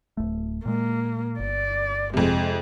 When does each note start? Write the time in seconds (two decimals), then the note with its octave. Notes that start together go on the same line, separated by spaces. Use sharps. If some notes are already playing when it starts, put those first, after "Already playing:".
0.17 D1 C#2 A3
0.66 A#2 G#3 A#3
1.40 G1 D5
2.14 F2 C3 G#3 G#4